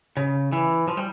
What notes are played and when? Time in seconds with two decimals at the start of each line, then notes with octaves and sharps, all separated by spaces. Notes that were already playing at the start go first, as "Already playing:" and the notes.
0.17 C#3
0.52 E3
0.88 F3
0.97 G3